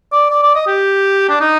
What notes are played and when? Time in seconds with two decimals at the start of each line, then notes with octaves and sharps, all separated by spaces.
0.12 D5
0.30 D5
0.43 D5
0.55 D#5
0.67 G4
1.29 D4
1.41 D#4